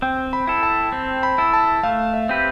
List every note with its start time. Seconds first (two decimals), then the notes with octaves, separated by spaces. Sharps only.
0.02 C4 G5
0.33 B5
0.47 E4 A4
0.63 A5
0.93 C4
1.23 B5
1.38 E4 A4
1.53 A5
1.83 A3 F5
2.14 E5
2.29 C4 G4 B4